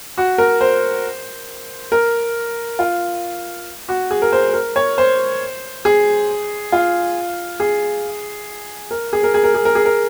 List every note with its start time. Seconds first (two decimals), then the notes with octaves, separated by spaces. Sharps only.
0.18 F#4
0.38 A#4
0.61 C5
1.92 A#4
2.79 F4
3.89 F#4
4.11 G#4
4.22 A#4
4.33 C5
4.54 A#4
4.76 C#5
4.98 C5
5.85 G#4
6.72 F4
7.60 G#4
8.91 A#4
9.13 G#4
9.23 A#4
9.34 G#4
9.44 A#4
9.54 G#4
9.65 A#4
9.75 G#4
9.86 A#4